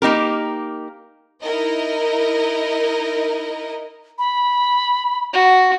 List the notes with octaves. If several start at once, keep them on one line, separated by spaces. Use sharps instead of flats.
A#3 D#4 G4 A#4
D#4 E4 A#4 D#5
B5
F#4